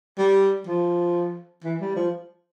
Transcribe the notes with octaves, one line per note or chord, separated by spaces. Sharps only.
G3
F3
E3
G3
F3